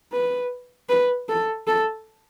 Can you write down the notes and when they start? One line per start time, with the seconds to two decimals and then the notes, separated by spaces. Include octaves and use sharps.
0.12 B4
0.89 B4
1.29 A4
1.67 A4